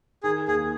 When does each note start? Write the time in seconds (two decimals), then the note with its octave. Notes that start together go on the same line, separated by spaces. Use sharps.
0.23 D#3 G#4
0.48 D#2 G#4